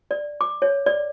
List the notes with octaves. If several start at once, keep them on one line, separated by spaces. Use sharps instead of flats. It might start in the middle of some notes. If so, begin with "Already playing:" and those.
D5
D6
C#5
D5